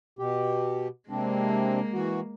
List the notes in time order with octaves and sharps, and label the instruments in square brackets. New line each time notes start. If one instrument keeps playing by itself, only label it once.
[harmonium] B2 G4
[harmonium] C3 C4 D4 [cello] G#3 A#3
[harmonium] E3 F#4